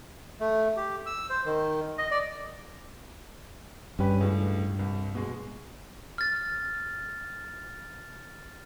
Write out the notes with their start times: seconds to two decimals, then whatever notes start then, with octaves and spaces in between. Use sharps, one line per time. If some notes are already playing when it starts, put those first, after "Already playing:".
0.40 A3
0.77 G4
1.06 E6
1.30 C5
1.46 D#3
1.98 D#5
2.11 D5
3.99 G2 C#4 G4 B4
4.21 C#2 A2
4.79 C2
5.15 B2 G#3
6.18 F6 A6